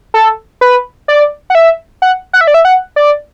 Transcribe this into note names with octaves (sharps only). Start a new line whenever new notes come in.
A4
B4
D5
F#5
E5
F#5
F#5
E5
D5
E5
F#5
D5